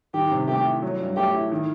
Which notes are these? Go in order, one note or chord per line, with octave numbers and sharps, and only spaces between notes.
D#3 G4
C3
A3 G4
E4
F#3
G2
A3 G4
E4
D#3